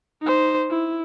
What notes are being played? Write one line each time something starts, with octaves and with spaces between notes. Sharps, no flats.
D#4 C5
E4